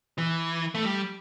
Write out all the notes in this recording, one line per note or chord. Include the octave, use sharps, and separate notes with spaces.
E3
A3
G3